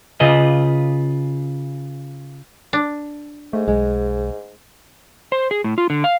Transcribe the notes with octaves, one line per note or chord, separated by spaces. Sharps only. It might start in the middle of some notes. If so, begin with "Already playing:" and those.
C#3 F4 G#4 B4 D#5
D4
G#2 A3
B1 G#3
C5
G#4
A2
F4
D3
F5